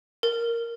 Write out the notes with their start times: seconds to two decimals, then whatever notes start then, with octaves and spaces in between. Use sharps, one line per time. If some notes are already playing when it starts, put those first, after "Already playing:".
0.23 A#4